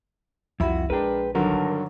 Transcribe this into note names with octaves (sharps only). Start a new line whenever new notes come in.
C2 F2 E4 F#4 B5
A#1 G#3 D4 A#4 B4 G5
G2 D3 D#3 F#3 A#4